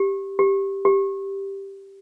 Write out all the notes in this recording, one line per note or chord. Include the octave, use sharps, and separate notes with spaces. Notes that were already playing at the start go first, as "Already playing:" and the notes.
Already playing: G4
G4
G4